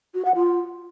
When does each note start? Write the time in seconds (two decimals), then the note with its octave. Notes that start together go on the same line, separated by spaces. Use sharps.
0.14 F#4
0.25 F#5
0.35 F4